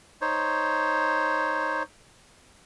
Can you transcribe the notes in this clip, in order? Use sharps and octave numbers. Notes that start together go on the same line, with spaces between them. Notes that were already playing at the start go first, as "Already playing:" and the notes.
D#4 C5 C#5